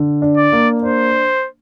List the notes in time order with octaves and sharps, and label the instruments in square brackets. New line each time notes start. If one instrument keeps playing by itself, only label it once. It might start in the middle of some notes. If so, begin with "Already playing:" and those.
Already playing: [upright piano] D3
D4
[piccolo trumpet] D5
[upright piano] A#3
[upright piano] D4 [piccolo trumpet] C5